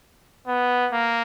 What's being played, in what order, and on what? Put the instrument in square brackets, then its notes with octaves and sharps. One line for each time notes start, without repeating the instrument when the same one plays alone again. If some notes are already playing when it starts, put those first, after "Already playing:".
[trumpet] B3
A#3